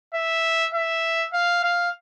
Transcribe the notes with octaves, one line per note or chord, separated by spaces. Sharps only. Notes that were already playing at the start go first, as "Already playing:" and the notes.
E5
E5
F5
F5